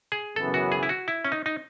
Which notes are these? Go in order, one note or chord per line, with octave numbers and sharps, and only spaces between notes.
G#4
F#2 C#3 E3 B3 A4
F#4
G#4
E4
F#4
E4
C#4
D#4
D#4